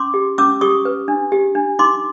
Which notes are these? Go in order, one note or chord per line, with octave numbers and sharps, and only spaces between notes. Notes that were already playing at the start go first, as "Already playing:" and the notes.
Already playing: C#4 C6 D6
G4
C#4 D6 E6
G4 C#6 D#6
B4
D4
G4
D4
D#4 C6 D6